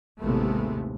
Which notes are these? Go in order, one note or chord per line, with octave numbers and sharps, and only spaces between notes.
A1 D#2 C3 G#3 A3 B3